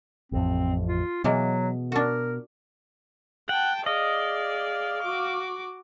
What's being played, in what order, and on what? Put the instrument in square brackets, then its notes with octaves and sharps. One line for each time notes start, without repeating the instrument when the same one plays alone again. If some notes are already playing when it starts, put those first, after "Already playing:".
[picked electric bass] A1 F2 [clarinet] C4
[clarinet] F4
[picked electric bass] B2 [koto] E3 G#3 A#3 [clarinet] F#3
[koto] D4 F#4 [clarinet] A#4
[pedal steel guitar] F#5 [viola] G5 A5
[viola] G#4 D5 [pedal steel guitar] D#5 [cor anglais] F5
[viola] F#4 D6